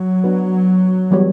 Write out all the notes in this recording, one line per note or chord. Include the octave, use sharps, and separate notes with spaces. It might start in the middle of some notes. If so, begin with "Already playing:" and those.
Already playing: F#3
B3 D4 F#4 B4
E3 G3 B3 F#4 C#5